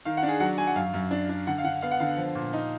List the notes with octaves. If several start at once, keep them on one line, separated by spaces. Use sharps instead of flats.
D#3 F5
F#5
D4
G#4
F#3 F#5
F#3 G#5
F#5
F#2 F5
F#2
D4
D4
D3 F#5
F5
D3 F#5
B3 F5
F#5
D3 F5
F3
A#2
D#4